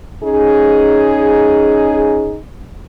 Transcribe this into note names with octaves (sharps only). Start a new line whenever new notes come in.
C#4 D#4 G#4